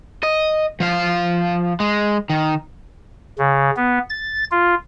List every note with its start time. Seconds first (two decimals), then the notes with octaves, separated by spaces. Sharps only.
0.23 D#5
0.80 F3 F5
1.80 G#3
2.30 D#3
3.39 C#3
3.76 B3
4.09 A6
4.51 F4